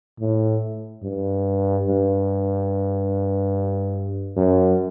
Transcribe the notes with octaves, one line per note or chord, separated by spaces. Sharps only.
A2
G2
G2
F#2